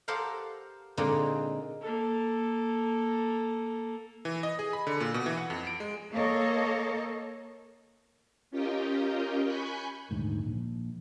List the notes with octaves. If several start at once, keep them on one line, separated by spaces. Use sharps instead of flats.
G4 A4 A#4 C5 F5 F#5
A#2 D3 G#3 C4 D#4 F4
A#3 A4
E3
D#5
G#4
B5
D3
A#2
B2
E3
F#5
F2
D7
G#3
A#3 A4 A#4 C#5 D#5
C#4 F4 G4 A#4 D#5 G5
G#5 B5 C#6 F#6 G6
D#1 D2 G#2
A#1